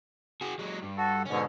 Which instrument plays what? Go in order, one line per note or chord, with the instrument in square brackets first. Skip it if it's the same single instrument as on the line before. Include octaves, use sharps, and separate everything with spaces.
[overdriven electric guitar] F#4 G#4
F#3 G#3
G2
[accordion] F#4 A4
[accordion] G#2 B2 D3 [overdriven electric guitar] C#4